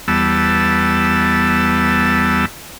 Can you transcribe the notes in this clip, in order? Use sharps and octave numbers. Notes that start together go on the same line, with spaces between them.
E2 G3 B3 A5 E6